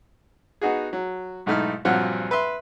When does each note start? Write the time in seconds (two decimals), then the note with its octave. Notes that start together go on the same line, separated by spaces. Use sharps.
0.61 B3 D#4 F#4 G#4
0.93 F#3
1.46 B1 G#2 A3 D#4 E4 F6
1.85 A#1 G2 F#3 C4 F4 F#5
2.31 B4 E5 C6